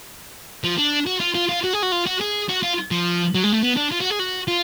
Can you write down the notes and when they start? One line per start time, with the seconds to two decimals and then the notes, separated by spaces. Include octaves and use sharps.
0.64 F3
0.78 D4
1.07 F#4
1.20 F4
1.35 F4
1.49 F4
1.63 F#4
1.73 G#4
1.82 F#4
1.92 F4
2.06 F#4
2.20 G#4
2.49 F#4
2.63 F4
2.91 F3
3.35 F#3
3.44 G#3
3.52 A3
3.62 B3
3.77 D4
3.92 F4
4.00 F#4
4.10 G#4
4.19 F#4
4.48 F4